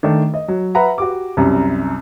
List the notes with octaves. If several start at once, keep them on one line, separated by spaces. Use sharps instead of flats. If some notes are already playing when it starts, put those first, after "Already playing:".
D#3 A3 D4
D#5
F#3
B4 E5 F#5 A#5 B5
F#4 G4 D6
C2 F#2 G3